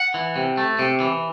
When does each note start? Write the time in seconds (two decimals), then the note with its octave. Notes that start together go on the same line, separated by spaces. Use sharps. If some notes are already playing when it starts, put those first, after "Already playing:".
Already playing: F#5
0.14 E3
0.36 C3
0.57 A3
0.79 C3
1.00 E3